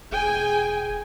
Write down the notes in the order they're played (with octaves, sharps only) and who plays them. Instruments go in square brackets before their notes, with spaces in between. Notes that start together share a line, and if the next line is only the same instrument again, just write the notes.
[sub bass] E1 [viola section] G#4 G5 G#5